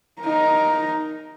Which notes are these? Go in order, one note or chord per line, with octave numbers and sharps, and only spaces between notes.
D#4 A#4